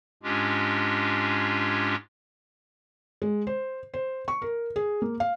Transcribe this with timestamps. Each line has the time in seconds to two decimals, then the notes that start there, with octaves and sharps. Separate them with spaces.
0.23 G#2 G#3 C#4 D4 F4 G4
3.22 G#3
3.47 C5
3.94 C5
4.28 C#6
4.42 A#4
4.76 G#4
5.02 A#3
5.20 F5